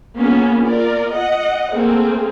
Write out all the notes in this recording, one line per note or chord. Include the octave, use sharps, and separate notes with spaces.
A#3 B3 C#4 F4 G#4
F4 A#4 D5
D#5 F#5
A3 A#3 C4 G#4